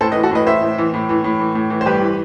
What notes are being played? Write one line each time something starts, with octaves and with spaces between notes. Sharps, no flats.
A2 A4 C5
B4 D#5
E3
F#4 A4
A2 B4 D#5
E3 C5 E5
A2
E3
A2
E3
A2
E3
A2
E3
C5
G2 G4 B4
E3